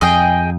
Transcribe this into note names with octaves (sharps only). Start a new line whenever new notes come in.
F2 G#4 D#5 G5